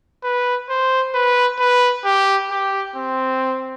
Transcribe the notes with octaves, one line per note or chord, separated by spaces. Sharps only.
B4
C5
B4
B4
G4
G4
C4